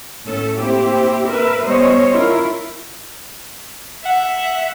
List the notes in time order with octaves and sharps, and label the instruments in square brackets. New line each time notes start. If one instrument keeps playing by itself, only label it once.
[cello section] A2 A3 C#4 A4
A#3 C4 E4 G4
A#4 B4 E5
G3 B3 C5 C#5 D#5
C#4 E4 F4 A#4
[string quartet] E5 [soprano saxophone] F#5